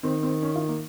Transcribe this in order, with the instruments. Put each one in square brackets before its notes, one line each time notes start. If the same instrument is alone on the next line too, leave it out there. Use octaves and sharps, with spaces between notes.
[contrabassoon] D#3 [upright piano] C4
[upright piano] C4
C#4
F4
A#3